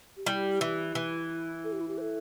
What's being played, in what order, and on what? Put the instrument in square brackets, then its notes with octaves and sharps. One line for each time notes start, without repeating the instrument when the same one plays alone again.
[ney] G4
[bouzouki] G3 [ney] E4
[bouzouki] E3
E3
[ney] A4
G4
E4
G4
C5
A4